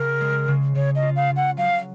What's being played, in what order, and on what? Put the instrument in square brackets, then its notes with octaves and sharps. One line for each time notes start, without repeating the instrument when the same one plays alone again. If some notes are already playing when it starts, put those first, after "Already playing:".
Already playing: [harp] C#3 [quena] A#4
[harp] G#3
C#3
[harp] C#3 [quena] C#5
[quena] D#5
[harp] F4
[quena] F5
[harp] C#3
[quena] F#5
[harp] F#3 [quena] F5